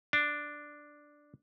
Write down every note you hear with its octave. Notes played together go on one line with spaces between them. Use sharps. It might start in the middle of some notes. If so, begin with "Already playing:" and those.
D4